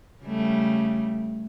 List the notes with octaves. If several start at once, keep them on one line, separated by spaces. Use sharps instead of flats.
C#3 G3 A3